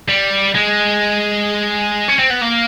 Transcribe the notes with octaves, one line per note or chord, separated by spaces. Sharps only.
G3
G#3
C#4
C4
B3
A#3